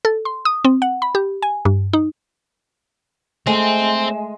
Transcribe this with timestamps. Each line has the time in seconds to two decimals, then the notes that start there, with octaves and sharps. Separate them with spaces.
0.05 A4
0.25 C6
0.45 D#6
0.65 C4
0.82 F#5
1.02 B5
1.15 G4
1.42 G#5
1.65 G2
1.93 D#4
3.47 G#3 A3 C4